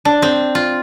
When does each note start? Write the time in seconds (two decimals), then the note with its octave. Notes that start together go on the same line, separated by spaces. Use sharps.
0.05 D4
0.22 C4
0.55 F4